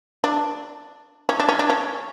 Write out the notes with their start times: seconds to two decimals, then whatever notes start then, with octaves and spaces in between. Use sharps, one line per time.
0.24 D4
1.29 C#4
1.40 D4
1.49 C#4
1.59 D4
1.70 C#4